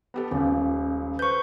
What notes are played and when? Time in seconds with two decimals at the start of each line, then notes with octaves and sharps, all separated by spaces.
0.14 B3 G4 A4
0.31 D#1 C#2 C#4
1.19 B4 C5 C#6 G6